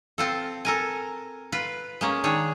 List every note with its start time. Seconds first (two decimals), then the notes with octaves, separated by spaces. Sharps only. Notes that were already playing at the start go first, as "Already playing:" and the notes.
0.18 C4 F4 A4
0.65 A4 A#4 G#5
1.52 F4 B4
2.01 G#3 A#3 C#4
2.24 D#3 D4 G#4 C#5